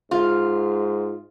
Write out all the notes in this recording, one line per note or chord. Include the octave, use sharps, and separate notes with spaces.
G#2 F4